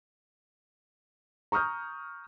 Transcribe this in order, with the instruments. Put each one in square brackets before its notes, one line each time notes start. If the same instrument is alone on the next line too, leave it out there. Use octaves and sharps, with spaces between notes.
[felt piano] A#5 C#6 D#6 F6 G6